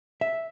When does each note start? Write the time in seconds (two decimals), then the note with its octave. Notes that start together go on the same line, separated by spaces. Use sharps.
0.21 E5